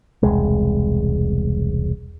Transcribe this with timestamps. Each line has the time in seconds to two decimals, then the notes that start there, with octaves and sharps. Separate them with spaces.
0.23 E1 C2 G#3